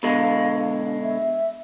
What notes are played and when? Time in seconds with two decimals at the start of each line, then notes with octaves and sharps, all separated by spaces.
0.03 B2 D3 G#3 F5
0.84 D4
1.02 E5